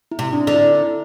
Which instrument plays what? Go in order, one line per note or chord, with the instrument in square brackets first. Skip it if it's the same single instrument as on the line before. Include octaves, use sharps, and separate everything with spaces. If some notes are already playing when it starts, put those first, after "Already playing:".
[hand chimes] E4
[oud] C3
[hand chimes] D4
[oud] D3
[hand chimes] E4
E4